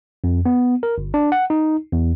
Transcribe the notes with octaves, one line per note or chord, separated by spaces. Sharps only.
F2
B3
A#4
G1
D4
F#5
D#4
E2